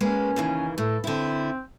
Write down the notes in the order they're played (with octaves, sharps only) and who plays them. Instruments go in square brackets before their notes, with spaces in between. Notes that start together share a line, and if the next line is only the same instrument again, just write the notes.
[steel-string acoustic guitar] G#3 A#3 B4 [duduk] C#4
[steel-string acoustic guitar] D#2 C#3 E3
[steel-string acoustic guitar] A2 [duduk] A4
[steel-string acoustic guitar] D3 E4 [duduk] C4